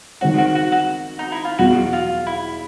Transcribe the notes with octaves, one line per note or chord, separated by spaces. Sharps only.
D#3 G#3 C4 F#4
F#4
F#4
F#4
D#4
E4
F4
E2 B2 F#3 F#4
F4
E4